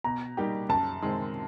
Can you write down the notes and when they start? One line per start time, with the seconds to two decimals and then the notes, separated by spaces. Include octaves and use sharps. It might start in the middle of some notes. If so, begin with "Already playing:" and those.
0.04 B2 A#5
0.37 G3 A#3 D#4 G4
0.69 F#2 A5
1.02 D#3 G#3 C4